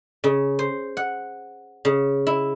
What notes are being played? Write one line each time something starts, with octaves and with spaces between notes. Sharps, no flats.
C#3
C5
F#5
C#3
E4